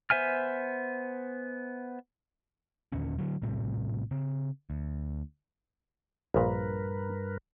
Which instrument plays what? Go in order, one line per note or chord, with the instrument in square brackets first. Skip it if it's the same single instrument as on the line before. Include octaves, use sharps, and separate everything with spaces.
[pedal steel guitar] B3 C5 E5 G#5 F6
[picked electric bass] D#2 A#2 D3 C#4
D3 F#3
A#1 A2 C3 G3
C#3 C4
D2
[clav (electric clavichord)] A#1 A#2 [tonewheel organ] G2 A#4 B4